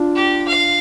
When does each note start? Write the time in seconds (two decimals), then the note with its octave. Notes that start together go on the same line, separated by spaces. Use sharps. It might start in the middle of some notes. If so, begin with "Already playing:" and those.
Already playing: D4 F4
0.16 G4
0.47 F5